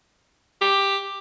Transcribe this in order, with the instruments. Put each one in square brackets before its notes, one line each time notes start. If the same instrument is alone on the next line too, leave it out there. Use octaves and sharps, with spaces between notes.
[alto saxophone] G4